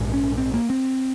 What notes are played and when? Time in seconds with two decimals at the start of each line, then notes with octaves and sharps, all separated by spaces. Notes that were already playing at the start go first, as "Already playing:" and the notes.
Already playing: A#1 G#2
0.13 C#4
0.38 C4
0.54 A#3
0.70 C4